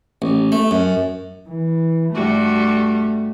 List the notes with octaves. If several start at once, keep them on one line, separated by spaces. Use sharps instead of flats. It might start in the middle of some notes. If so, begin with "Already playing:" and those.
A1
A3
F#2
E3
G2 G3 A3 F#4